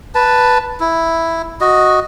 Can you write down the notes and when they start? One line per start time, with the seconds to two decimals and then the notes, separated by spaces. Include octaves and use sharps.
0.15 B4 A5
0.80 E4
1.61 F#4 D#5